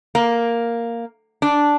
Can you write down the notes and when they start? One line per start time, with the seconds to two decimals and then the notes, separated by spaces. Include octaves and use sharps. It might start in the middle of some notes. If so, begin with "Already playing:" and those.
0.15 A#3
1.42 D4